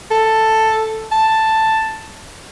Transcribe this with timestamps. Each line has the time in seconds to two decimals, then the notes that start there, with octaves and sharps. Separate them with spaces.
0.11 A4
1.12 A5